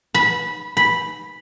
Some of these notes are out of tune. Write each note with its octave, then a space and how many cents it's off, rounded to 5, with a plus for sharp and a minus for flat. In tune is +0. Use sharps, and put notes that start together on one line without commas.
B5 -15
B5 -5